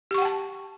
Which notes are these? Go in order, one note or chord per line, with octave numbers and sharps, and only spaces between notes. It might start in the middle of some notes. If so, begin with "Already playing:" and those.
G4 F#5 G5 A5 C#6